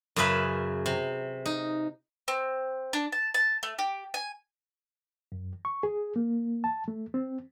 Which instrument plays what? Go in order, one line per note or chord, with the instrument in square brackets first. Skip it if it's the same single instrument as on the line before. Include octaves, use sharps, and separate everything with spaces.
[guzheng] F#2 C#3 G#4 B4 E5
C3
D#4
[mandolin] C4
D4
A5
A5
A3
G4
G#5
[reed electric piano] F#2
C#6
G#4
A#3
A5
A3
C4